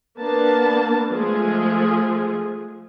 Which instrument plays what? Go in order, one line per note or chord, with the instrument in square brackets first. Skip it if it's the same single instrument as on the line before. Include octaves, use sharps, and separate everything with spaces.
[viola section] A#3 B3 D4 A5
F3 G#3 A3 G#4